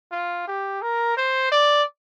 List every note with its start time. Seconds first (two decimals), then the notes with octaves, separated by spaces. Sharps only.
0.12 F4
0.48 G4
0.82 A#4
1.17 C5
1.52 D5